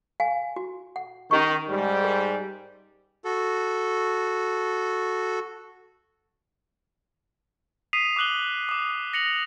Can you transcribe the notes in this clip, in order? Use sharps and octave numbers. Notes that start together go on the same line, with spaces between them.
F5 G#5
F#4
F#5
D#3 C#4 G4 C#6
G#2 G3
A#4
F#4 A4
D#6 B6 C7 D#7 F7
D6 D#6 F#6 F#7 G7
D6 D#6
A#6 C#7 F7 F#7